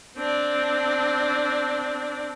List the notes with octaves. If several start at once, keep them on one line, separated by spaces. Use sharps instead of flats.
C4 D4